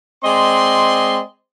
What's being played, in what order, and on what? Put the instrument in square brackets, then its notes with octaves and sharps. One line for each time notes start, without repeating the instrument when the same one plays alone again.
[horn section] G#3 C4 D5 D#5 C6